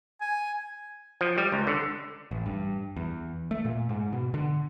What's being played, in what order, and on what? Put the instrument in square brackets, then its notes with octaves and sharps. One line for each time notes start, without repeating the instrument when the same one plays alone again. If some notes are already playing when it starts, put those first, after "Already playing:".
[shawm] G#5
[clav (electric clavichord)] F3
G3
C#2
D3
[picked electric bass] A1
G2
E2
A3
A#2
G#2
B2
D3